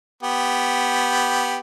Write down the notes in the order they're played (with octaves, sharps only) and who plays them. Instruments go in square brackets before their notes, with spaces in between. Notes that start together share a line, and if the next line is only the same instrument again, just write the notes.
[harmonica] B3 G4